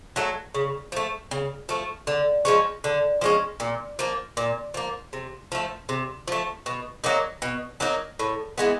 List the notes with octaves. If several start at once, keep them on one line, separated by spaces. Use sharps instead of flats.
F#3 A3
C#3
F3 A3
C#3
F3 A3
D3
F3 G#3 C#4
D3
F3 G#3 C#4
A#2
F3 A#3
A#2
F3 A#3
C3
F3 A3
C3
F3 A3
B2
F#3 A#3 D#4
B2
F#3 A#3 D#4
A2
E3 G#3 B3